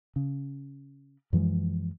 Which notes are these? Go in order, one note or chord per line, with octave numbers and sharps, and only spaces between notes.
C#3
F#2 E3 F3 G#3